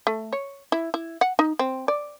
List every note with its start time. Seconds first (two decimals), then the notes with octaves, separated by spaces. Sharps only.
0.07 A3
0.33 C#5
0.72 E4
0.94 E4
1.21 F#5
1.39 D#4
1.59 C4
1.88 D5